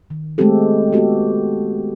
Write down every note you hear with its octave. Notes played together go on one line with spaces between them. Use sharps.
D#3
G#3 A3 B3 C4 G4 A4
B3 C4 F#4 G4 A4